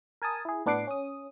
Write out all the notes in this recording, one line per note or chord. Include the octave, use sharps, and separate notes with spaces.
A#4 G#5 A5 D#6
E4 G#4
A2 B3 D4 F#5 D6 C7
C#4 D#6